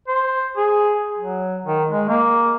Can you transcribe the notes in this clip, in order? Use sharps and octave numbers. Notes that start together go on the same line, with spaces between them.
C5
G#4
F#3
D#3
G#3
A#3